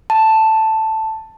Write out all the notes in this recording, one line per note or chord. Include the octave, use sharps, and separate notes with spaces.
A5